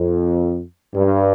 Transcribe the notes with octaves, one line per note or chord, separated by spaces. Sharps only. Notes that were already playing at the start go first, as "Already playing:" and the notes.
Already playing: F2
G2